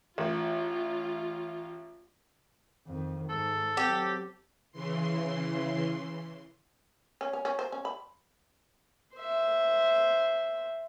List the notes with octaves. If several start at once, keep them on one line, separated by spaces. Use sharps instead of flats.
A1 F4
F2 D#3
G#2 A4
F#3 C4 G4
C#3 E3 C6
C#4
C#4
C#4
C5
C#4
B5
C5 E5